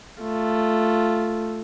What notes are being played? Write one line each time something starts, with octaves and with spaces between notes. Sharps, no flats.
A3 F4